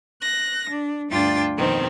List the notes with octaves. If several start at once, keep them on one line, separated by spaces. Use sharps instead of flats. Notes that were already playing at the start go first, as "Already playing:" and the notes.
F#6 A#6
D4
D2 G2 D4 F4 G5 A6
F2 B2 D#3 C4